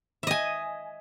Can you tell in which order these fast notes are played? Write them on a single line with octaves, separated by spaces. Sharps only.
E5 D#5 G#5